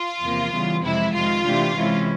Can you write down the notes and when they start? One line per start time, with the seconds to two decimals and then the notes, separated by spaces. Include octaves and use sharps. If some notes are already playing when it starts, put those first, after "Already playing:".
Already playing: F4
0.22 E2 C3 F3 A#3
0.52 C#3 E3 G3 B3
0.83 F2 C3 E3 G#3 E4
1.13 F2 C3 D#3 G#3 F4
1.44 C3 E3 A3 D4 G4
1.75 C3 E3 G#3 C#4 E4